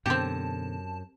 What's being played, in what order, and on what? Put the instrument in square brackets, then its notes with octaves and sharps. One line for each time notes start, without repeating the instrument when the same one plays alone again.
[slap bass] F#2 [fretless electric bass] B2 D3 [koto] C4 G4 [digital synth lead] A5